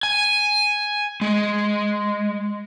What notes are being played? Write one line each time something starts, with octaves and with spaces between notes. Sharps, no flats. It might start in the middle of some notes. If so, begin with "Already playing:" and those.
G#5
G#3